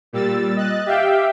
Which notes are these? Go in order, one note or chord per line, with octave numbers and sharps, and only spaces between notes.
A#2 G3 E6 A6
D#5 F#6 A6
G4 E5 F5 G5